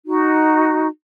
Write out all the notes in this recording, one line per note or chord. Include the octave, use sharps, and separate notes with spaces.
D#4 F#4